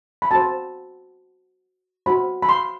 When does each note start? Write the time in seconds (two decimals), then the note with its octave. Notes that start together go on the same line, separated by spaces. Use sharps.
0.22 B5
0.31 F#4 C5 A5
2.06 F#4 C5 B5
2.42 B5
2.49 C6